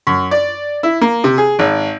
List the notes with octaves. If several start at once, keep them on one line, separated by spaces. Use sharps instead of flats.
F#2
D5
E4
A#3
C3
G#4
G#1